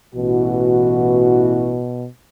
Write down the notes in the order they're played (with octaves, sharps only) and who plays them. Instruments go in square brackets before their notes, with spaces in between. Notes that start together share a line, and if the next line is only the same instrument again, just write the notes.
[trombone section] A1 E3 F#4 [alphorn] B2